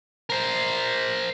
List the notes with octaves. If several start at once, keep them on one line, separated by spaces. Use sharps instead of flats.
A#4 C5